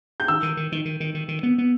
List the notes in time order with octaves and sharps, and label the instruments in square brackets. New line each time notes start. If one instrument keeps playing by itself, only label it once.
[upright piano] G6
[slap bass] D#3 [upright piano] E6
[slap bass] D#3
D#3
D#3
D#3
D#3
D#3
D#3
B3
B3